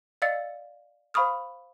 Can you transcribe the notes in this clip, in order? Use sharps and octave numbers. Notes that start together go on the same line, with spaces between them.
D5 D#5 F5 E6 A6 C#7
C5 F5 B5 C#6 D#6 F6